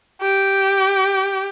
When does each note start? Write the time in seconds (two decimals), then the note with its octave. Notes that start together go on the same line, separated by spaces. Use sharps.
0.21 G4